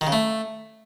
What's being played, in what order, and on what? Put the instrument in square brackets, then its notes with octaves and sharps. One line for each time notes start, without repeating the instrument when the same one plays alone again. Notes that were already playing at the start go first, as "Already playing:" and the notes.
[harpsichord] D#3
C#3
A3